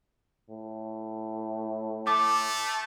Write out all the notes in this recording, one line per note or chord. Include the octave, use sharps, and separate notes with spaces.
A2
A3 A5 D6